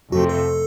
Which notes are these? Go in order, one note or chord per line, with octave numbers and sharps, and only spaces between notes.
F2 C3 F3 A3 C4 F#4
A4